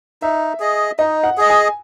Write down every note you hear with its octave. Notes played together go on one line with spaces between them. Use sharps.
D#4 E5
G#4 D#5
D#4 D#5
F#5
G#4 D#5
G#5